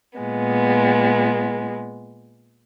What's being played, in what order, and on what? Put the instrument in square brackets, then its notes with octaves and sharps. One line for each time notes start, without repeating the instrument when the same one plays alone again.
[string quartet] A#2 G#3 B3